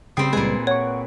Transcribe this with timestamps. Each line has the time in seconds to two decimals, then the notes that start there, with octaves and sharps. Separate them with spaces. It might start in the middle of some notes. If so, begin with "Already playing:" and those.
0.17 C#3 G3 C4 G5 D#6 C7
0.33 C#2 A#2 G3 G#3 G#4 B4
0.67 C#5 F#5 C#6